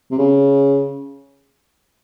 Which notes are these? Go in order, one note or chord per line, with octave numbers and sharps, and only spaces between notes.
C3
C#3